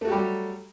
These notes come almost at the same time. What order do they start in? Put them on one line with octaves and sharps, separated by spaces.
A3 F#4 G4 G3 F#3